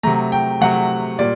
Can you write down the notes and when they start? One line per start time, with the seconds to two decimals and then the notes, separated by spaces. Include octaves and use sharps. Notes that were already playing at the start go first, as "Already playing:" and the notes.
0.03 C3 F#3 A3 A#5
0.32 G5
0.61 C3 F#3 A3 F#5
1.19 A#2 G3 D5